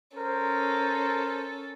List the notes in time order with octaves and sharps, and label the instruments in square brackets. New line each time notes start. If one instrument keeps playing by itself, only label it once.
[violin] C#4 A4 [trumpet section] A#4 C5